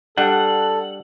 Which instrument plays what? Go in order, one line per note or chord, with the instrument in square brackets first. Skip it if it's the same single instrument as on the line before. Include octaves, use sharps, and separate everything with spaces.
[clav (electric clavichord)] G3 D4 [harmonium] A4 [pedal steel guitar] F#5